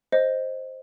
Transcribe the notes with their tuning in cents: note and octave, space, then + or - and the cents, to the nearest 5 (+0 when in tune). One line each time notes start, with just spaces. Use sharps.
C5 +10 D#5 +0